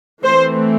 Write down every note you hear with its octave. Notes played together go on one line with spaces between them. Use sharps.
E3 A3 C4 C5